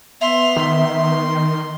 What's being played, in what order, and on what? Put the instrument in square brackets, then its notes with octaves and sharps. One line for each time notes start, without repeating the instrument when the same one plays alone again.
[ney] B3 [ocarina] E5 [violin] C6 F7
[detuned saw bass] D#3 [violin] C6